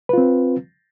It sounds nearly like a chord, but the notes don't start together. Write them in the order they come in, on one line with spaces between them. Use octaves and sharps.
B4 F4 C4